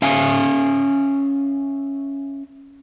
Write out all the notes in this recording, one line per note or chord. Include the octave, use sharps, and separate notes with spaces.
C#4 E5 F5 G#5